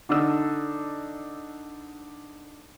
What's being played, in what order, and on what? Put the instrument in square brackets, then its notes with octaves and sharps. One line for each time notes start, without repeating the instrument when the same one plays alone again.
[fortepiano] D3 D4 D#4 E6